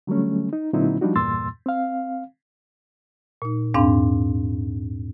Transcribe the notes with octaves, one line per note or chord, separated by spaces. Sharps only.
D3 F#3 G3 A3 C#4
D#4
A#2 D3 F#3 C4 D#4 E4
F3 G3 D4 D#4 F#4
E2 G2 A#2 C6 E6 A6
C4 F5
A#2 D#4
E2 G#2 C4 D4 F5